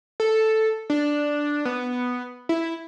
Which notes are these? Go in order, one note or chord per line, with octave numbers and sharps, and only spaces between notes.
A4
D4
B3
E4